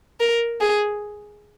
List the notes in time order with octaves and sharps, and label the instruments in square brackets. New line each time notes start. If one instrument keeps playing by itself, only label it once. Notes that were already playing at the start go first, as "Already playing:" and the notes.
[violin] A#4
G#4